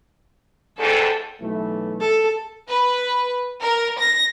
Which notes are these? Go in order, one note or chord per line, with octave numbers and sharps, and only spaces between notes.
E2 G#2 A4 G5
B1 E3 A3
A4
B4
A#4
A#6